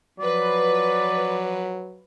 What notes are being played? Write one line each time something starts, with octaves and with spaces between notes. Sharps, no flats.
F3 F#3 B4 D5